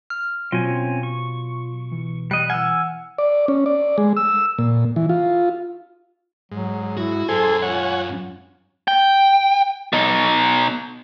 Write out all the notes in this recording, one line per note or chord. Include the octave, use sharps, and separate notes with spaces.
F6
B2 F#3 C4 C#4 F4 G#5
C#6
E3
G3 D#5 F#6
E3 F#5 G#5 E6 F6
D5
C#4
D5
G#3
E6
A#2
E3
F4
G#2 F#3
E4 F#4
F#2 G#4 A4 C5 G#5 C6
F4 C#5 F#5 G#5
G5
B2 D#4